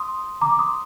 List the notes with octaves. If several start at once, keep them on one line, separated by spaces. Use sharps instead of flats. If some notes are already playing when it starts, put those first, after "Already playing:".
Already playing: C6 D#6
A#5 D6
D6
C6 D#6